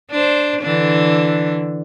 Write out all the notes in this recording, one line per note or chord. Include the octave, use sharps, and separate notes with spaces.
D4 C5
D3 E3 D4